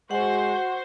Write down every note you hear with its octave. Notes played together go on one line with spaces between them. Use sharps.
G#3 F#4 C5 F#5